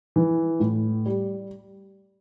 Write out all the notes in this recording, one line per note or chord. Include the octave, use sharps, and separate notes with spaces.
E3
A2
G3